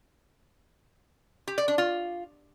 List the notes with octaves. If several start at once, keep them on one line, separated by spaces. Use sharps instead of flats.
G4
D5
D4
F4